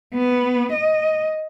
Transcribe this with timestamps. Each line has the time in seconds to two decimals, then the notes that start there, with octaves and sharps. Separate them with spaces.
0.14 B3
0.72 D#5